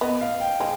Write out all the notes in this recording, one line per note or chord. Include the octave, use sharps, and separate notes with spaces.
B3 D#5
F5
G5
G#3 G#4